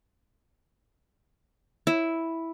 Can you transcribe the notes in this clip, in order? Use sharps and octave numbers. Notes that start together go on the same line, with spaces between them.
E4